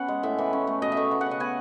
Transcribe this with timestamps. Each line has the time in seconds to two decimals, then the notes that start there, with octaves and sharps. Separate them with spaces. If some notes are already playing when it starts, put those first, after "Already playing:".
Already playing: B3 C#4 F#5
0.08 G#3
0.23 A2 E5
0.38 E3
0.53 C#4
0.67 A3
0.82 B2 D#5
0.92 E5
0.97 A3
1.11 B3
1.21 F#5
1.26 C#3 D#5
1.40 B3 G#5